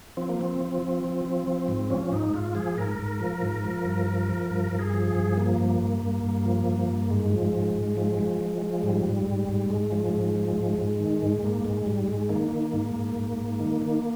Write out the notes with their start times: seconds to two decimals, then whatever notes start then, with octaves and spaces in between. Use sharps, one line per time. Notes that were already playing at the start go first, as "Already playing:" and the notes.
0.17 F3 C4
0.29 A#3
0.40 F3 C4
0.61 F3
0.82 F3
1.05 F3
1.25 F3
1.48 F3
1.68 G#2
1.90 F3 C#4
2.12 G#2 D#4
2.34 G#2 F4
2.55 F3 G#4
2.77 G#2 A#4
2.99 G#2
3.20 F3
3.42 G#2
3.64 F3
3.85 G2
4.07 F3
4.29 F3
4.51 G2 A#4
4.72 G2
4.79 G#4
4.94 F3
5.08 G#4
5.15 G2
5.37 F3 A#3
5.59 G2
5.81 G2
6.03 G2
6.23 G2
6.45 F3
6.67 G2
6.89 G2
7.10 G#2 G#3
7.32 F3
7.53 G#2
7.75 G#2
7.97 F3
8.19 F3
8.41 F3
8.62 F3
8.83 G#2 G3
9.06 G#2
9.26 G#2
9.49 G#2
9.70 G#2 G#3
9.92 F3
10.14 G#2
10.35 F3
10.57 G#2
10.78 G#2
11.00 D#3
11.22 G#2
11.43 G#2 A#3
11.64 G#2 G#3
11.86 G#2 G3
12.08 G#2 G#3
12.29 D#3 A#3
12.51 D#3
12.73 G#2
12.96 G#2
13.16 G#2
13.38 G#2
13.60 D#3
13.82 D#3